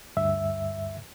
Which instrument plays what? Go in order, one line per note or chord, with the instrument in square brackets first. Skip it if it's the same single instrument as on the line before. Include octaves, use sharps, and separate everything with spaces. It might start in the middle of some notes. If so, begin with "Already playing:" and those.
[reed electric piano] D2 G2 E5